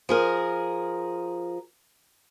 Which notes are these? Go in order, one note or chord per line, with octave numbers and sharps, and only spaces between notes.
F3 G#4 A#4